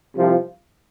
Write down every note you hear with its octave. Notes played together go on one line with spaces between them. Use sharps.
C2 C3 F3